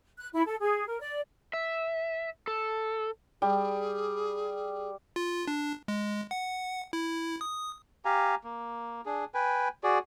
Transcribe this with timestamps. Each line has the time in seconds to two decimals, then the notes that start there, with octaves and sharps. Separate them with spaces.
0.19 F#6
0.32 E4
0.47 A4
0.60 G#4
0.87 A#4
1.00 D5
1.53 E5
2.47 A4
3.42 G3 G#4
5.16 F4
5.47 D4
5.88 G#3
6.31 F#5
6.93 E4
7.41 D#6
8.05 G4 F5 G#5 A#5
8.44 A#3
9.06 D4 G#4
9.34 B4 G5 G#5
9.83 F#4 G#4 D5